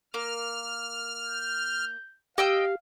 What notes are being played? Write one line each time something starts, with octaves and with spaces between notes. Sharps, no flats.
A#3 F6
G6
G4 D#5 F5 G5 E6